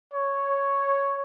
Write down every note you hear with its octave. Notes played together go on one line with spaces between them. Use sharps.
C#5